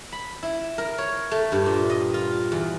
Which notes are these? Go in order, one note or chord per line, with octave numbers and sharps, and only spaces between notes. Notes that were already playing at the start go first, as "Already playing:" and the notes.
B5
E4
A#4
C#5
A3
G2
A#2
D#5
F4
E2